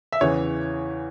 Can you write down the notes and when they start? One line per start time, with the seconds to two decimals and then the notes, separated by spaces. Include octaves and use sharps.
0.12 E5
0.21 E2 C#3 E3 C#5